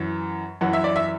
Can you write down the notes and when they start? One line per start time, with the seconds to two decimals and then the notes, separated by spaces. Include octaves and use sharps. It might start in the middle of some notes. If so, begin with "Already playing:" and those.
Already playing: F#2 E3
0.61 F#2 E3 F#5
0.73 E5
0.84 D5
0.96 E5